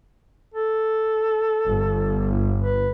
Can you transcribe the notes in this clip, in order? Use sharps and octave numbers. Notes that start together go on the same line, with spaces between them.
A4
G1
B4